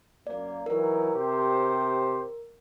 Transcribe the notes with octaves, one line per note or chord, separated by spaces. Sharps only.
F#2 A#3 D5
E3 F#3 D#4 A#4
C3 G4 C5